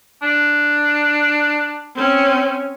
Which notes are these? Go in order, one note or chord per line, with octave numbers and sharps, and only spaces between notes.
D4
C4 C#4